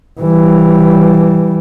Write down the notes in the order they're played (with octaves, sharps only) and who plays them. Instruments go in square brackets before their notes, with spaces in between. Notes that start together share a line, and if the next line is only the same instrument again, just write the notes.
[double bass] E3 G3